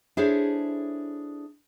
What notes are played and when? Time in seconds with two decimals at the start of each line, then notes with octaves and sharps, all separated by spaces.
0.17 D4 E4 G#4 A4 C5 C#5